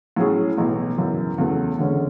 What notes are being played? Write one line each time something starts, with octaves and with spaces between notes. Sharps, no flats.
A2 F#3 C#4 G#4
B1 A2 E3
F#2 C#3 E3
E2 C#3 F#3 A3
F#1 E2 D3 G#3 C#4